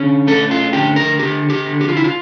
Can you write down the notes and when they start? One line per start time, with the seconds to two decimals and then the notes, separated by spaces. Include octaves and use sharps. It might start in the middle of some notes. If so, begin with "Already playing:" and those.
Already playing: D3 C#4
0.27 A3 A4
0.51 F4
0.73 D3 G4
0.96 A#4
1.19 D3 G4
1.50 G4
1.66 D3
1.81 G4
1.89 F4
1.97 E4
2.04 F4